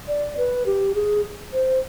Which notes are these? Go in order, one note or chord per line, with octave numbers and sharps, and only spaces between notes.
D5
B4
G4
G#4
C5